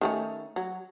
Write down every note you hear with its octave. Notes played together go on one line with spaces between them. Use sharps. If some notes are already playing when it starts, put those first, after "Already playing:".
D#3 A3 C#4
F#3